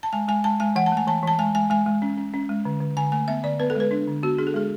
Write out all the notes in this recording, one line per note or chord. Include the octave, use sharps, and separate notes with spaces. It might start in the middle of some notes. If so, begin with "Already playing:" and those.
A5
G#3 G#5
G#3 G#5
G#3 A5
G#3 G#5
E3 F#5
A5
A3
G#5
E3 A5
E3 A5
G#3 G#5
G#3 G#5
G#3 G#5
G#3
C#4
C#4
C#4
G#3
D3
D3
D3 G#5
A3 G#5
B3 E5
D3 D5
B3 B4
A4
G#3 B4
D4
D3
B3 F#4
D4 G#4
A4
G#3 G#4